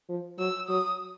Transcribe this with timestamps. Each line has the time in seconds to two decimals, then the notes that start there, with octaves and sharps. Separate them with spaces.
0.09 F3
0.38 F#3 E6
0.68 F#3 D#6